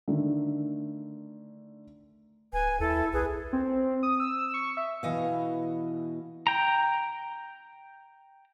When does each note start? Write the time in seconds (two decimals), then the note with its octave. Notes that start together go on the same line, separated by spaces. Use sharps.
0.08 D3 D#3 A3
2.53 D1 B4 G#5
2.80 D#2 E4 A4
3.13 B1 G#4 B4
3.53 C4
4.03 D#6
4.20 E6
4.54 C#6
4.77 E5
5.03 B2 E3 D#5 F5
6.47 G5 A#5